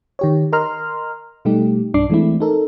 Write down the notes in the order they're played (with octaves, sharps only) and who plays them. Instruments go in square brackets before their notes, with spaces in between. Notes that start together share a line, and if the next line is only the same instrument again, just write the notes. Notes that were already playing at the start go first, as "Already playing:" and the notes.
[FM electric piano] D#3 G4 C#5
A#4 D#5 A#5 C6 F6
B2 G3 A3 D#4 G4
B1 G2 D4 D6 C7
E3 G#3 A3 C4 E4
D#4 A4 A#4